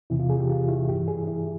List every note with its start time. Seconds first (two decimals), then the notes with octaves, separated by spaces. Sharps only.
0.10 E2 C3 E3 E4
0.20 F4
0.30 G#4
0.39 G4
0.49 F4
0.68 E4
0.88 G2 E3 G4
1.08 G#4
1.28 E4